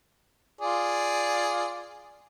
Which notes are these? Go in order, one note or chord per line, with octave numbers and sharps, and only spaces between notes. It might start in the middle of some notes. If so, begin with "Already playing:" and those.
F4 G#4 D5